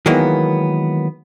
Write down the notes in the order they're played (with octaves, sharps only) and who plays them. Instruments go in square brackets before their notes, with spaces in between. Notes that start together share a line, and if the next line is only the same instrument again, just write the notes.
[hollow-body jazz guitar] D#3 E3 F#3 G#3 A#3 B3